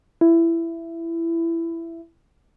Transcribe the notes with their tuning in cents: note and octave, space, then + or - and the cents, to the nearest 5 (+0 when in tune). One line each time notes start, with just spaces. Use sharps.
E4 +15